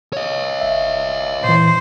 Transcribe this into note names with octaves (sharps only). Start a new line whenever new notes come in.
C#5 D#5
G1 E5
A#2 E3 C5